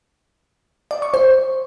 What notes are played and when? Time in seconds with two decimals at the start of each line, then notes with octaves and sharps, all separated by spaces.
0.91 D5
1.02 C#6
1.14 C5